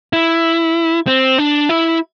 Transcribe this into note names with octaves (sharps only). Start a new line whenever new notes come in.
E4
C4
D4
E4